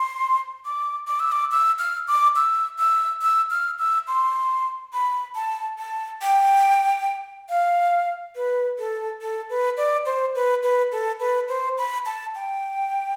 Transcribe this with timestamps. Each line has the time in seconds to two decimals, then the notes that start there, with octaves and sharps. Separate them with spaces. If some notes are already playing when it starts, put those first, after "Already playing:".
Already playing: C6
0.66 D6
1.07 D6
1.20 E6
1.32 D6
1.51 E6
1.79 F6
2.08 D6
2.36 E6
2.79 E6
3.22 E6
3.51 F6
3.79 E6
4.08 C6
4.93 B5
5.35 A5
5.78 A5
6.22 G5
7.49 F5
8.36 B4
8.79 A4
9.21 A4
9.50 B4
9.77 D5
10.06 C5
10.35 B4
10.63 B4
10.92 A4
11.20 B4
11.49 C5
11.78 B5
12.06 A5
12.35 G5